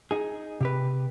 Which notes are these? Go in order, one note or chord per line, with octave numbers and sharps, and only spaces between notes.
D#4 G#4
C3 G4 B4